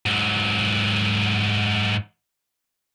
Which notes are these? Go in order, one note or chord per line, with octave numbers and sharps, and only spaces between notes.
G#2 F#3